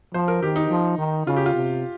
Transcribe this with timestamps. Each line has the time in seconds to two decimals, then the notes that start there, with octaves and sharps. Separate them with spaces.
0.14 F3 C5
0.28 A#4
0.43 D#3 G4
0.56 D#4
0.70 F3
0.98 D#3
1.27 C#3 F4
1.36 G4
1.46 F4
1.55 C3